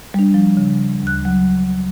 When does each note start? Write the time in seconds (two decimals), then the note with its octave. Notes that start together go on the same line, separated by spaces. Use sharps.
0.14 G3 D4
0.34 F3
0.57 C#3
1.03 D2 F#6
1.25 F#3